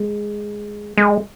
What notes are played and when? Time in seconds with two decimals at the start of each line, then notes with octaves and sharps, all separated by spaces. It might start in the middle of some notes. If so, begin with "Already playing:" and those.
Already playing: G#3
0.97 G#3